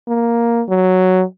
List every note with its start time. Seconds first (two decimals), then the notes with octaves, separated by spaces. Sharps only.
0.08 A#3
0.69 F#3